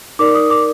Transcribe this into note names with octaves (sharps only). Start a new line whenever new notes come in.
D#4 A#4 D5 D6
D#6
D6